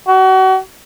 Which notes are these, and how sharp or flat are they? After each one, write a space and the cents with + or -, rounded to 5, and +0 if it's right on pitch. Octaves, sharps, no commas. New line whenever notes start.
F#4 +35